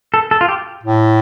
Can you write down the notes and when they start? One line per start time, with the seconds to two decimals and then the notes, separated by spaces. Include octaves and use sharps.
0.14 A4
0.31 A4
0.41 F4
0.49 G4
0.84 A2